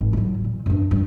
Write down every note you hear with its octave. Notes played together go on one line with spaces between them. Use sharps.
G#1
E3 F#3
A#2
F#2 D4
G2